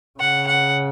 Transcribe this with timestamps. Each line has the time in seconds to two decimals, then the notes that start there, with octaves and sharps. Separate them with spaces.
0.20 C#3 F#5
0.47 F#5